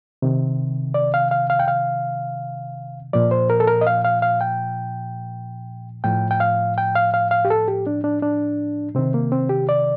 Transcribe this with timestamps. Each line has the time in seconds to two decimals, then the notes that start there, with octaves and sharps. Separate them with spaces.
0.22 C3 D#3
0.94 D5
1.14 F5
1.31 F5
1.50 F5
1.59 G5
1.68 F5
3.13 A#2 F3 D5
3.31 C5
3.50 A#4
3.60 A4
3.67 A#4
3.81 D#5
3.87 F5
4.05 F5
4.22 F5
4.41 G5
6.04 A2 F3 G5
6.31 G5
6.40 F5
6.78 G5
6.96 F5
7.14 F5
7.31 F5
7.45 G4
7.50 A4
7.68 G4
7.87 D4
8.04 D4
8.22 D4
8.95 C3 D#3 C4
9.14 A#3
9.32 C4
9.49 G4
9.69 D5